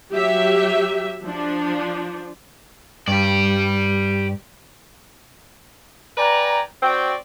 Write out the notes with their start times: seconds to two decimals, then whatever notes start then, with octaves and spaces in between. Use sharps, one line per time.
0.12 F#3 G4 E5
1.24 F3 D4
3.08 G2 G4 D5
6.18 B4 D5 G5 G#5 A#5
6.83 C4 F#4 D5 G5